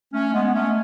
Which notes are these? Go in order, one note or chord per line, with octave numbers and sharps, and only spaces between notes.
A3 C#4
A3
G#3 B3
B3
A3 C#4